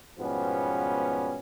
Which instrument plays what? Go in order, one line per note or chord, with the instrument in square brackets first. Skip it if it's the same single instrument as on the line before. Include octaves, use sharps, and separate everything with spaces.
[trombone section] G#2 B2 F3 G3 B3 C#4